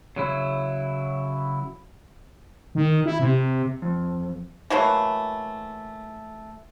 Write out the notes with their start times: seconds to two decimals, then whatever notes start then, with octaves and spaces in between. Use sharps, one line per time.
0.16 C#3 F#3 E4
2.75 D#3
3.06 E4
3.19 C3
3.82 F2
4.70 E3 F#3 A3 A#3